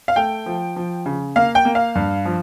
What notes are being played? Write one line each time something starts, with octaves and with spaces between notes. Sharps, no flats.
F5
A3 G5
F3
F3
C#3
A#3 F5
G5
A#3
F5
G2
F3